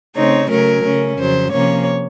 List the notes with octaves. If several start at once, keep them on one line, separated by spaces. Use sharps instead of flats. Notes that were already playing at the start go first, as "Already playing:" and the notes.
C#3 A3 C4 D#4 C#5
C#3 F#3 A3 C#4 A#4
C#3 A3 C#4
F2 C#3 F#3 C5
C3 F3 A#3 C#4 C#5